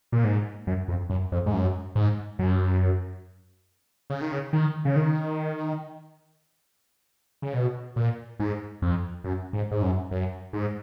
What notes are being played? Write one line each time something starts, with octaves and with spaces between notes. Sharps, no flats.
A#2
G#2
F#2
F2
F#2
F2
G#2
F#2
G#2
F#2
C#3
D#3
C#3
D#3
C#3
D#3
C#3
B2
A#2
G#2
F2
F#2
G#2
G#2
F#2
F#2
G#2